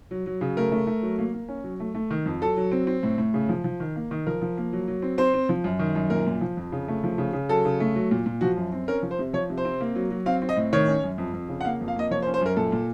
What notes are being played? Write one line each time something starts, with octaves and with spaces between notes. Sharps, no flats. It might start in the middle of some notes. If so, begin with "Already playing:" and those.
F#3
F#3
C#3
A3 A#4
A3
A3
F#3
A#3
A#3
C#4
F#3
A3
A3
D#3
F2
F#3 A4
F#3
C4
C4
A2
A2
C#3
F3
F3
D#3
A#3
D#3
F3 A#4
F3
A#3
F#3
F#3
C4
C4 C5
C4
F3
F#2
D#3
F#2
A#2 A#4
A#2
F3
F2
C#3
A3
F3
C#3
C#3
F#3 A4
C#3
A3
F#3
A#2
A#2
F3 F#4
F#2
C4
C#4 A#4
F3
C5
C3
F3 C#5
C3
C5
C4
A#3
F#3
F#3
C4 F5
C4
D#5
A2
D#3 C#5
C#4
F#2
F2
F2
C#3
F#5
A#3 F5
F2
F5
A#3 D#5
F3 C#5
C5
C#4
C5
F#2 A#4
A#2 A4
A#2